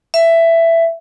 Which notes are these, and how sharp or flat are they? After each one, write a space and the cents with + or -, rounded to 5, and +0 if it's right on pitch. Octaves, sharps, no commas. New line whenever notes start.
E5 +10